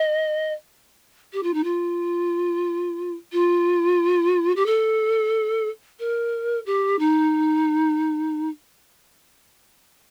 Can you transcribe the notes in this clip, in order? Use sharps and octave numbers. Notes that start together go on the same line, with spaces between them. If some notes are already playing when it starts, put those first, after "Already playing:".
Already playing: D#5
G4
F4
D#4
F4
F4
G4
A4
A#4
G4
D#4